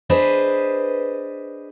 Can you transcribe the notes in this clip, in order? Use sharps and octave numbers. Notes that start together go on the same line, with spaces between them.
D4 G#4 B4 C5 D#5